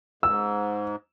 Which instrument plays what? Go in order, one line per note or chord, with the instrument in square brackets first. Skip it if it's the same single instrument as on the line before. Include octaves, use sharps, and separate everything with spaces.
[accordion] G#2 [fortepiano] E6